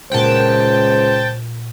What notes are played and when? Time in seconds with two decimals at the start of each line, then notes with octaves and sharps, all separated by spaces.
0.12 C#2 A#2 C5 F#5 G5 A5 F#6